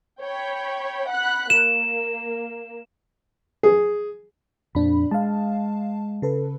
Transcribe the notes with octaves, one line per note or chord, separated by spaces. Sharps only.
C#5 G5 B5
F#5 B5 F#6
A#3 E7
G#4
F2 A#2 D4 B5
G#3 F5 A5
C#3 A4 B4